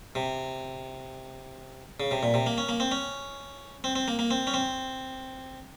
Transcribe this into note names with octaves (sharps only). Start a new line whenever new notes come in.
C3
C#3
C3
A#2
C3
A#3
C#4
A#3
C4
C#4
C4
C4
A#3
A#3
C4
C#4
C4